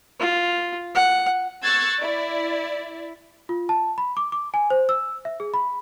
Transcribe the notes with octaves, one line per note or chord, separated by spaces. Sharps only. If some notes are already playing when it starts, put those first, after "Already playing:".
F4
F#5
C#6 E6 F#6 G#6 A6 C7
E4 D5
F4
A5
B5
D6
D6
G#5
C5
E6
E5
G#4
B5